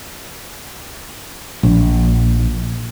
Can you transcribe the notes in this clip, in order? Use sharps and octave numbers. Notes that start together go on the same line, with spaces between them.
A#1